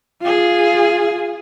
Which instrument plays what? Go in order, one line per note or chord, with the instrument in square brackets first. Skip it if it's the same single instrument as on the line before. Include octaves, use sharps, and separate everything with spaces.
[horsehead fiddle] F4 G#4